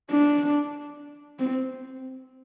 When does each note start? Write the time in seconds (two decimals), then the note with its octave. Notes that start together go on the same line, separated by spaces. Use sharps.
0.11 D4
1.39 C4